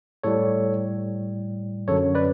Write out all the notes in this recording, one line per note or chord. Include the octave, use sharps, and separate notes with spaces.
A2 G3 A4 C#5
F#2 D3 F#3 A4 C#5
B4 D5